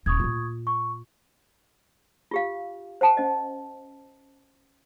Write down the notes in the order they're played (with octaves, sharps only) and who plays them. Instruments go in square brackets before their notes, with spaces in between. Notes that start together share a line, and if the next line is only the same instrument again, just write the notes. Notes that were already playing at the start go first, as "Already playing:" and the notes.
[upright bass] D#1 [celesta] C#6 D#6 G#6
[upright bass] A#2 F4
[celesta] C#6
[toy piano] F4 G4 F5
C5 F#5 A5
C#4 D#5